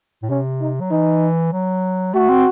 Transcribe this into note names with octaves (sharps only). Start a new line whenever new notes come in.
A2
C3 C#4
D#4
F#3
E3 D#4
F#3
A3 F#4
C4